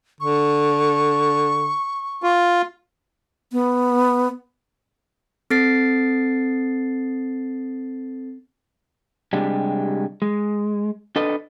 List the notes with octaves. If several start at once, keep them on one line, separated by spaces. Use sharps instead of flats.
D3 C#6
F4
B3
C4 A4 A6 C7
C3 G3 G#3 D4 G4
G#3
D4 A4 B4 D#5